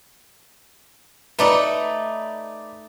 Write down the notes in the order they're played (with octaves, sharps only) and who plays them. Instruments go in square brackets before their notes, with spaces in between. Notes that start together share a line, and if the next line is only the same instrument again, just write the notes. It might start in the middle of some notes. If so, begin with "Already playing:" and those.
[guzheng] A3 D#4 A4 [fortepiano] B4 D5